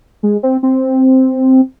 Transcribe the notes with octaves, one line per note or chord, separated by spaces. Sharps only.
G#3
C4
C4